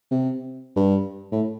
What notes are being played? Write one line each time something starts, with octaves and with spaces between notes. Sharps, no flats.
C3
G2
A2